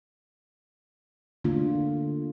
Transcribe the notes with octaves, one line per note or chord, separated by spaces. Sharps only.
D3 A3 A#3 D4 F4